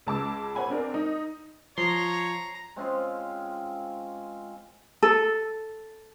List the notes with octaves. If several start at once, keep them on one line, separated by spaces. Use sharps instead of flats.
C#2 A5 D6 E6
C5 C#5 F#5 G#5 B5
C4 D4 A#4
D#4
F3 C#5 A#5 C6
G#3 C4 C#4 F4
A4